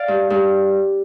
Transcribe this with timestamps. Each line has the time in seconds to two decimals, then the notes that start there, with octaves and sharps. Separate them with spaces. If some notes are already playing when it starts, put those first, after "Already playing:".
Already playing: D5 F5
0.08 G2
0.30 G2